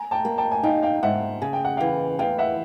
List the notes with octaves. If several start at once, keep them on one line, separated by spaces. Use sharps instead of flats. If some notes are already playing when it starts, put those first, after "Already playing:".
Already playing: G#5 A#5
G5 A5
A#3
G5 A5
G#5
D#4 F5 G5
F5 G5
G#2 E5 F#5
C#3 G#5
G5
F#5
E3 F5 G5
E2 F5 G5
E5 F#5